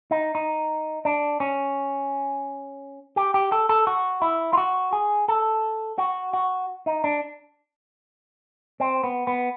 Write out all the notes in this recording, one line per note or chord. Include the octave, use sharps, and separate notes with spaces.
D#4
D#4
D4
C#4
G4
G4
A4
A4
F#4
E4
F4
F#4
G#4
A4
F#4
F#4
D#4
D4
C4
B3
B3